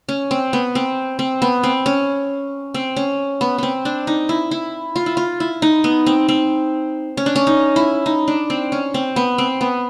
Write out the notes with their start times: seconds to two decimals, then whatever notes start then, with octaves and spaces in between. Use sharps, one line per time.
0.09 C#4
0.31 C4
0.53 B3
0.75 C4
1.19 C4
1.42 B3
1.63 C4
1.86 C#4
2.74 C4
2.96 C#4
3.41 B3
3.58 B3 C4
3.85 D4
4.07 D#4
4.29 E4
4.51 E4
4.96 F4
5.06 E4
5.17 F4
5.40 E4
5.62 D#4
5.84 B3
6.06 C4
6.28 C4
7.17 C#4
7.26 D4
7.36 C#4
7.47 D#4
7.76 E4
8.06 D#4
8.28 D4
8.50 C4
8.72 C#4
8.94 C4
9.16 B3
9.38 C4
9.61 B3